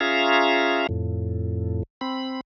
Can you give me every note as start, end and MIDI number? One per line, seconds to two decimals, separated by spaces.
0.01 0.87 61
0.01 0.87 65
0.01 0.87 68
0.01 0.87 76
0.01 0.87 77
0.01 0.87 82
0.89 1.83 41
0.89 1.83 45
2.01 2.41 60
2.01 2.41 83